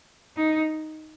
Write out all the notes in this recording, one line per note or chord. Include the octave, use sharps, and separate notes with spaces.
D#4